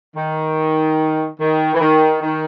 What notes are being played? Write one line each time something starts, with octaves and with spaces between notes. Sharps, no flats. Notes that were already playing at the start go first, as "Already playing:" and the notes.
D#3
D#3
E3
D#3
D#3